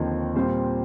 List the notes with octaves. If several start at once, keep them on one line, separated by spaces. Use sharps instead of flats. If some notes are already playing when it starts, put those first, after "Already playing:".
Already playing: D#2 D3 F3 C4 D#4
A#2 G3 C4 F4 C5